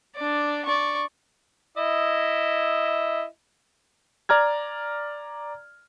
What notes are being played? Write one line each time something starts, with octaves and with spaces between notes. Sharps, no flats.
D4 D5
D5 C#6
E4 D#5 E5
D5 A#5 F6 G#6